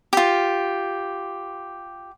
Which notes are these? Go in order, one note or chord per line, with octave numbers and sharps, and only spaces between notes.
F4 G4